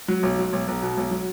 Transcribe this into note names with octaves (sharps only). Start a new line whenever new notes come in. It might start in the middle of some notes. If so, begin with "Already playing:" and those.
F#3
B1
F#3
B1
B1
B2
B1
F#3